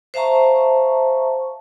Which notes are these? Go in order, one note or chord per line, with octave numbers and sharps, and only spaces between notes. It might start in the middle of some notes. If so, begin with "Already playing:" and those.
C5 E5 F5 A5 A#5 C#6